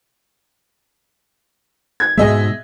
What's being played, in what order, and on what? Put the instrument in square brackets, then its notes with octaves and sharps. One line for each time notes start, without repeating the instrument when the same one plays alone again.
[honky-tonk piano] G#6
[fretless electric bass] G#2 B2 G#3 [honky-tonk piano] G#4 D#5 E5